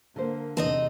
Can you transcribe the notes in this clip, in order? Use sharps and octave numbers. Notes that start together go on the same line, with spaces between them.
D3 A#3 C5
E2 A2 C3 E3 C4 D4 D#4 D#5